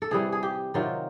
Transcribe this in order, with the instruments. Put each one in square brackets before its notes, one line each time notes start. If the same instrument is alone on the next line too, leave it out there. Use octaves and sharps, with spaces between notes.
[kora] A4
C3 E3 G3 G#4
G#4
G4
C3 D#3 F#3 F4